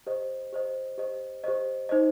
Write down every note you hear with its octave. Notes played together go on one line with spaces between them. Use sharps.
G4 C5 D#5
G4 C5 D#5
G4 C5 D#5
G4 C5 D#5
D#4 C5 D#5